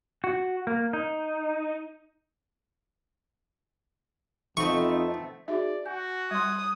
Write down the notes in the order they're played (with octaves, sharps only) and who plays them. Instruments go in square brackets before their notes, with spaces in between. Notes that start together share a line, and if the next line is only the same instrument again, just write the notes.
[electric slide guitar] F#4
A#3
D#4
[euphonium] F2 [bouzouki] A3 B3 C4 [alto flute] D#4 [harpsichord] C#6
[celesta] D#4 F#4 G#4 [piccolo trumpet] D5 [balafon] E5
[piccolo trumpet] F#4 [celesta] G#5 G6
[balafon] G3 C6 [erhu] D#6 [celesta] F#6 G#6